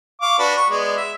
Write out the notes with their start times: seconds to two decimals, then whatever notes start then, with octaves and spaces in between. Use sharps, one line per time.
0.21 F5 C#6 D6
0.39 D4 F#4 B4
0.57 C#6
0.70 G#3 B3 D5
0.97 E5